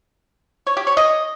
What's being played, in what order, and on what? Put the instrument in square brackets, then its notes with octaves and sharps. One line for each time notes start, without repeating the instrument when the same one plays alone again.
[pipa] C#5
G4
C#5
D#5